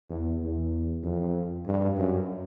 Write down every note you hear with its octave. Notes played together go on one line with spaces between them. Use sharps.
E2
E2
F2
G2
F#2